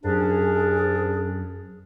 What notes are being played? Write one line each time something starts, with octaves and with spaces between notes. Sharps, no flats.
C2 F#2 C#4 D4 G#4